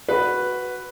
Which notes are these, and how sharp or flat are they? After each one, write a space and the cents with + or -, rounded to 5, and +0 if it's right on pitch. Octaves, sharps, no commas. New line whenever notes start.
F#4 +0 B4 +0